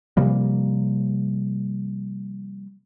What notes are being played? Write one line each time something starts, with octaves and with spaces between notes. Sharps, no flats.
C3 F3 G3 A#3